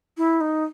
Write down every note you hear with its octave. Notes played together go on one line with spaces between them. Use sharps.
E4
D#4